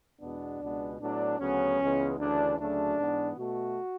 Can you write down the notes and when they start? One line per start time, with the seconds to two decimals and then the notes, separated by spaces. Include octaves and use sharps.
0.21 E2 B2 G#3 B3 D4
0.60 C#2 B2 G#3 B3
1.00 A2 F#3 B3 D4
1.39 D2 C#3 F#3 B3 C#4
1.80 C#2 C#3 E3 G#3 B3
2.19 D2 C#3 E3 D4
2.59 D2 C#3 F#3 A3 D4
2.98 G#2 E3 B3
3.38 B2 A3 F#4